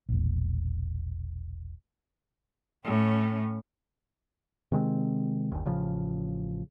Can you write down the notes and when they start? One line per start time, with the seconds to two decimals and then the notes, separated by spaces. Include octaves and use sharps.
0.09 E1 A#1
2.84 A2 C#4
4.72 C3 D#3 G#3 C4
5.52 G1 D#2
5.65 A1 C#3 F3